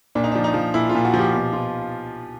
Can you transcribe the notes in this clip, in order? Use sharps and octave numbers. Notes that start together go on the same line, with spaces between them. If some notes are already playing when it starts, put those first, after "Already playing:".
A#2 D4
D#4
F3 D4
D#4
F3
A#2 E4
F4
A#2
F#4
F3
G4
B2 G4
B2 F4